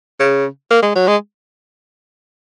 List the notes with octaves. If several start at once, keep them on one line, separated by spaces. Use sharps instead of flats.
C#3
A#3
G#3
F#3
G#3